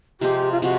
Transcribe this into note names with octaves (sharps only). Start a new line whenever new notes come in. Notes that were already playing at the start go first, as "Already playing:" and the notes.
C3 F3 G#3 C4 G4
F4
C3 F3 G#3 F#4